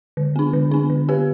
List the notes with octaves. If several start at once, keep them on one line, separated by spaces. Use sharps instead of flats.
D3
B3 D4
D3
B3 D4
D3
B3 G4 B4